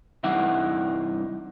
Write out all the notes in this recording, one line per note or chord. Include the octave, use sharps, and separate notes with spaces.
C2 G2 E3 D#4 E5 F#5